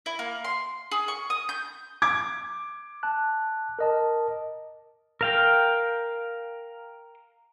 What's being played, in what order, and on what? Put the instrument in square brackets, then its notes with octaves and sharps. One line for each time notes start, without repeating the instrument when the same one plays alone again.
[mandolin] E4
A#3
C6
G#4
C#6
D#6
G6
[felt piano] D6 G#6
[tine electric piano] A5 F#6
A#4 D#5 A5
[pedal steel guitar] A#4 F5 G5